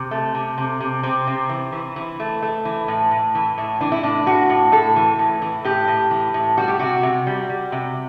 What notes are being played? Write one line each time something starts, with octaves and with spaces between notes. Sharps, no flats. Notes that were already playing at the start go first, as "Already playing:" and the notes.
Already playing: C3
A3
C3
C3
C3
C3 C4
C3
E3
E3
E3
A3
A3
E3
A2
A2
E3
A2
E3 D4
E4
A2 D4
A2 F#4
A2
A2 A4
E3
A2
E3
A2 G4
A2
E3
A2
G3 F#4
G4
C3 F#4
C3
G3
G3
C3